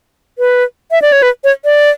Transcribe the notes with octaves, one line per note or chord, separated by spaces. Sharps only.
B4
E5
D5
C#5
B4
C#5
D5